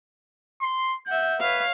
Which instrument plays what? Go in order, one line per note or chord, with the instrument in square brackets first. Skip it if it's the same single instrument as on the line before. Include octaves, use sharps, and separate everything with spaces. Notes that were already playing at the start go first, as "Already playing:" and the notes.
[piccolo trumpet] C6
[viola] E5 F#5 [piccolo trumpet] G6
[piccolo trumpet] B4 [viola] C#5 F5